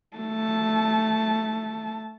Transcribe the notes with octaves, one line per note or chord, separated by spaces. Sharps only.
A3 A5